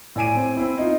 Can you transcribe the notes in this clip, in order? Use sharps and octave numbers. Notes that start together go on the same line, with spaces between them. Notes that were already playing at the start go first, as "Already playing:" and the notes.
A2 D5 G#5 D7 D#7
C4
C4 E4
D#4 F4